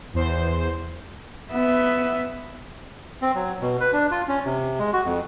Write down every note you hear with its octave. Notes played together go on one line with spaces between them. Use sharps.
E2 C5
B3 E5
C4
F#3
B2
B4
D4
F4
C#4
C3
G#3
F#4
F2